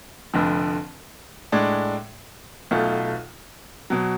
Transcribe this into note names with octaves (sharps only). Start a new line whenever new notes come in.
F1 F2 D3 F3
A2 G#3 D4
B1 B2 A3 F4
B2 F#3